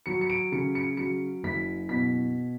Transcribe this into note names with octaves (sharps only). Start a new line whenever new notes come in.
F#3 C#7
C#7
D7
C#3 C#7
C#7
F#3 C#7
F#1 B6
B2 B6